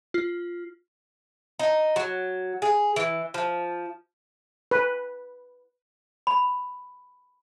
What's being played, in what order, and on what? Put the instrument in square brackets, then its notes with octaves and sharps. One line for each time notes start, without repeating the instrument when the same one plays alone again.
[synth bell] F4
[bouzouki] D#4
F#3
G#4
E3
F3
[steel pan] B4
[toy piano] B5